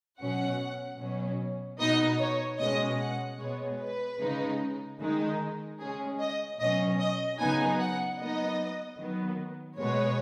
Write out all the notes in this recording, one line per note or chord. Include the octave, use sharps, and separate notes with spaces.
B2 F#3 C#4 F#5
B2 F#3 C#4
B2 B3 D#4 D#5
C#5
B2 G#3 C#4 D#5
F#5
B2 G#3 B3 C#5
B4
C#3 G#3 D#4
D#3 G#3 D#4
C#3 G#3 C#4 G#4
D#5
B2 F#3 C#4 D#5
D#5
C#3 F#3 B3 D#4 G#5
F#5
F#3 B3 D#4 D#5
D#3 F#3 B3
B2 G#3 B3 C#5